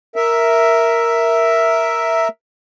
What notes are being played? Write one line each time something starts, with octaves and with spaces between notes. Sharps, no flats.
A#4 E5